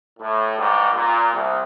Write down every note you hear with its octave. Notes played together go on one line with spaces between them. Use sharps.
A2
G#2 E3 G3
A#2
C2